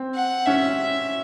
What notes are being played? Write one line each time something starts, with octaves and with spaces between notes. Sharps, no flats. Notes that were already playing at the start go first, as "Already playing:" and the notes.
Already playing: C4
F#5
C#4 E5